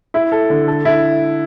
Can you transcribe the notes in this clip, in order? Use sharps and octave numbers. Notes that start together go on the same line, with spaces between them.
E4
A4
D3
A4
E4